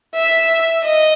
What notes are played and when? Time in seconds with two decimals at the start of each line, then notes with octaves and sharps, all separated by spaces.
0.15 E5
0.83 D#5